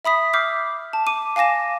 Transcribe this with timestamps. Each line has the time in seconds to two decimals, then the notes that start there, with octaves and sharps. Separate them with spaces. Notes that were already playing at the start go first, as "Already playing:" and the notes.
0.05 E5 B5 D#6 B6
0.33 D6 E6 F6 G6 B6 C7
0.93 A5
1.07 D6 D#7
1.36 F5 G#5 D6 A#6 E7